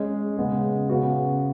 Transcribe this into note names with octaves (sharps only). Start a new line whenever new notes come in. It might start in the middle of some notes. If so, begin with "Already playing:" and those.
Already playing: G#3 C#4 G#4
C#3 G#3 B3 G#4
C#3 B3 F#4